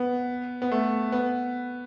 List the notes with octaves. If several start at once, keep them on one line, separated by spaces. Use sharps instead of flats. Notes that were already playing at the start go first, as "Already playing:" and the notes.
Already playing: B3
B3
A3
B3